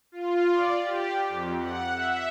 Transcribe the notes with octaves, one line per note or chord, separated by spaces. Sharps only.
F4
D5
G4
F2
F#5
E5